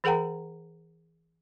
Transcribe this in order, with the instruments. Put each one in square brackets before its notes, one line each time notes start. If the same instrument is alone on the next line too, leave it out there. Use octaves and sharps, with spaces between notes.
[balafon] E3 G#4 A#4 F#5 G5 A#5